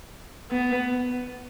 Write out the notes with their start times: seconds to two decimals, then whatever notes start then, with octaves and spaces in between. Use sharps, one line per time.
0.51 B3